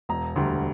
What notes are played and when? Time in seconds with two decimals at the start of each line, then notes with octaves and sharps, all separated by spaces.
0.09 E1 A#5
0.36 D2 D3 G3